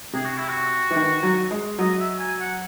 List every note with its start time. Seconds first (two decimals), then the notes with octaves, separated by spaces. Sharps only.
0.13 C3 G#4
0.25 F#4
0.37 E4
0.48 F#4
0.91 E3
0.96 D#3
1.23 F#3
1.51 G#3
1.78 F#3 D#5
1.99 E5
2.19 G#5
2.40 F#5